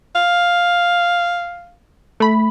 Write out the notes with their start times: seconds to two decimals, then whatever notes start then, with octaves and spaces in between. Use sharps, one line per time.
0.15 F5
2.20 A3 B5